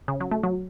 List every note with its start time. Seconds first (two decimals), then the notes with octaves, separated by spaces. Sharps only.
0.08 C#3
0.20 F#3
0.31 A3
0.43 F#3